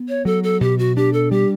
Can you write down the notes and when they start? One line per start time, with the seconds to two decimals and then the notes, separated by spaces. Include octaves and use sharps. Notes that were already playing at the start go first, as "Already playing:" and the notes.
Already playing: B3
0.09 C#5
0.25 F#3 A4
0.43 A4
0.61 B2 G4
0.79 F#4
0.96 D4 G4
1.13 A4
1.31 G3 G4